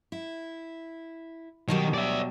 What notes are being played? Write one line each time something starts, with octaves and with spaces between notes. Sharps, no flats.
E4
B2 D#3 F#3 G3
D5 E5